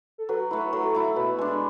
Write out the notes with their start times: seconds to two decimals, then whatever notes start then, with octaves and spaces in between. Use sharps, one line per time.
0.18 A4
0.29 F#3 B4
0.51 A3 E4 B4
0.73 F#3 A4
0.95 A3 E4 A4
1.16 B2 B4
1.38 G#3 D4 B4